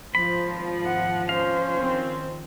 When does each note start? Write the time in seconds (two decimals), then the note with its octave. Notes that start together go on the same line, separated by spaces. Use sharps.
0.15 G#1 F3 C5 B5
0.86 F#5
1.29 C#4 C5 F5
1.79 D#3 F3 C4